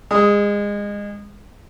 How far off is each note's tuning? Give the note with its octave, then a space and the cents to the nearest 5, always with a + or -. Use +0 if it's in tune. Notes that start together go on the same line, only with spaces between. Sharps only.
G#3 -25 D#6 +5